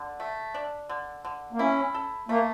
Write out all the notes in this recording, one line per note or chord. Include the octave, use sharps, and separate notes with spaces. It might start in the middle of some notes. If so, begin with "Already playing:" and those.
Already playing: D3
A3
D4
D3
D3
A#3
C#4 E4
A4
A3 A#3